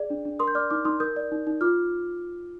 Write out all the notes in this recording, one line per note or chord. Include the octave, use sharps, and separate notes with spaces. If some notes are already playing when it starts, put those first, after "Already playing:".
Already playing: G#4 D5
D4
D4
A#4 C6 D#6
G6
D5 D6 F6
D#4 D6 F6
D#4 C6 D#6
A#4 D#6 G6
D5
D#4
D#4
F4 D6 F6